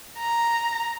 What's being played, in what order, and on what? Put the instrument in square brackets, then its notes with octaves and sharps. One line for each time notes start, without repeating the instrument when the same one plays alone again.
[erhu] A#5